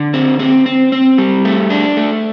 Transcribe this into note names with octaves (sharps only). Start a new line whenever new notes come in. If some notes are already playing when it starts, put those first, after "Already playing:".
Already playing: D3
C4
C4
C4
C4
G3
A3
D4
A3